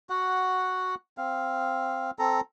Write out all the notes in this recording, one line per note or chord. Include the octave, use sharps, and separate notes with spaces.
F#4 F#5
C4 F5
C4 A4 A#5